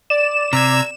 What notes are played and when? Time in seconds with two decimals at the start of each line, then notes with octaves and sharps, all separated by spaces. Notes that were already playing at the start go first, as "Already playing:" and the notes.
0.10 D5 E7
0.53 C3 A#5 E6 G#6